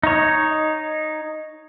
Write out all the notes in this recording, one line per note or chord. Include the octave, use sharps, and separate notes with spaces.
D#4 C#5